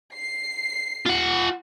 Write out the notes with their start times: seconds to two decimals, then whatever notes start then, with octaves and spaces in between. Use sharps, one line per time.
0.14 C7
1.06 F4 F#5